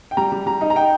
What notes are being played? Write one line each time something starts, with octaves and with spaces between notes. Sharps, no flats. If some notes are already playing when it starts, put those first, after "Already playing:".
G5
G3 A#5
G3
G3 A#5
D#4
A#5
D#4 G5